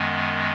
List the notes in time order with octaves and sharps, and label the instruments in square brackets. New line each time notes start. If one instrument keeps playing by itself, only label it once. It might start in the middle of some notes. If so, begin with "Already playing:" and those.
Already playing: [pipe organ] F#2 D#3 G#3 B3